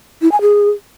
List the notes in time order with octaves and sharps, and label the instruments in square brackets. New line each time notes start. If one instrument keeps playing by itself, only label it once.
[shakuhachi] E4
G#5
G#4